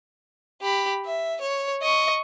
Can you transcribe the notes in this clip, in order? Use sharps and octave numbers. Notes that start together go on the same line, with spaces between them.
G4 B5
E5
C#5
D#5 C#6